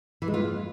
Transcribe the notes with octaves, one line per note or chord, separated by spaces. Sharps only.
E3
G#3
F4